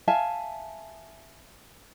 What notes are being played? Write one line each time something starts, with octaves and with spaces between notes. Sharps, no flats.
E5 F5 G#5 A5